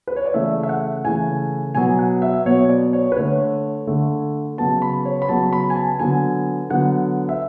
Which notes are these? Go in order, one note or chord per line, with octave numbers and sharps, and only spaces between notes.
B4
C#5
D5
C#3 E3 A3 E5
E5
F#5
C#3 E3 A3 G#5
B2 F#3 B3 G#5
F#5
E5
B2 F#3 B3 C#5
D5
C#5
B4
D3 A3 C#5
D3 A3
C#3 F#3 B3 A5
B5
C#5
B5
C#3 F#3 B3 A5
B5
G#5
A5
D3 F#3 B3 G#5
D3 F#3 B3 F#5
E5